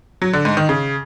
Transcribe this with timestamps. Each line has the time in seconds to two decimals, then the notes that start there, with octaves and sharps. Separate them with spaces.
0.22 F#3
0.33 D3
0.45 G#2
0.57 D#3
0.69 C#3